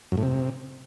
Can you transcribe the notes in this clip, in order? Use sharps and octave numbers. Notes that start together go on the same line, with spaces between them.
F#2
A2
C3